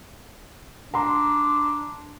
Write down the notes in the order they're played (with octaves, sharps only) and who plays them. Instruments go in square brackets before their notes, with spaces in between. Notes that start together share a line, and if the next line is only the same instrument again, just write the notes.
[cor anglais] D4 [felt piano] A#5 C6